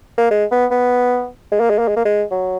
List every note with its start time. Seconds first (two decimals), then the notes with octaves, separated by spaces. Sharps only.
0.18 A#3
0.31 G#3
0.51 B3
0.71 B3
1.51 G#3
1.60 A#3
1.70 G#3
1.79 A#3
1.88 G#3
1.96 A#3
2.05 G#3
2.31 F#3